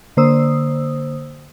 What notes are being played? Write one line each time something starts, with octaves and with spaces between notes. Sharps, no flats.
D3 A#3 C5 D#6 E6